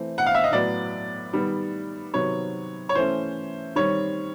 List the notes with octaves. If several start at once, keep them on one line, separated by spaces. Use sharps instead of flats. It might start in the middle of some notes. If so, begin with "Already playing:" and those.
Already playing: E3 A3 C4
F#5
F5
E5
D#5
A2 F#3 B3 D5
D#3 G3 B3
C3 D#3 F#3 B3 C#5
C#5
E3 A3 C#4 C5
D#3 G3 C4 C#5